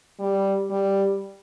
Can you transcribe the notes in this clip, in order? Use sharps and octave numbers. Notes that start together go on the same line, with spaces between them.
G3
G3